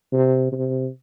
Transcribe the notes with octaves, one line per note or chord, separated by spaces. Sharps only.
C3
C3